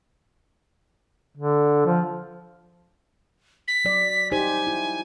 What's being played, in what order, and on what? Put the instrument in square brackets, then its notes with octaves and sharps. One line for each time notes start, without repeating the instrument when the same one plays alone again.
[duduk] D3
F3
[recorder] B6
[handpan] F#3 D5
[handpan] D#4 G4 C5 [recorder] G#5
[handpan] E4